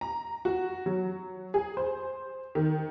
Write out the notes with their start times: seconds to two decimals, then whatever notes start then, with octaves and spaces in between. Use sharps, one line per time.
0.01 A#5
0.45 F#4
0.86 F#3
1.54 G#4
1.77 C5
2.55 D#3